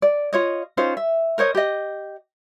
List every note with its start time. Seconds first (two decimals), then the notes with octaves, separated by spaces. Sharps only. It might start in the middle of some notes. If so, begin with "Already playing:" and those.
0.02 D5
0.33 F4 C#5 D#5
0.77 C#4 D#4 F4 C5
0.97 E5
1.38 A#4 C5 C#5 D#5
1.55 G4 D#5